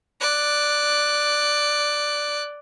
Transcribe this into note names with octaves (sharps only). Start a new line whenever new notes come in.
D5 F#6